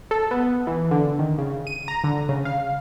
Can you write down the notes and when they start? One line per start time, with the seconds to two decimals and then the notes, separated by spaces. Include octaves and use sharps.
0.11 A4
0.31 B3
0.43 B3
0.67 E3
0.91 D3
1.19 D#3
1.38 C#3
1.67 D#7
1.88 A#5
2.04 D3
2.29 C#3
2.45 F5